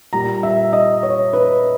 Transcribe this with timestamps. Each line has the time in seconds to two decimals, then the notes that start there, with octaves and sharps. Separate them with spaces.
0.13 A#2 G3 A#5
0.43 E5
0.73 D#5
1.03 C#5
1.33 B4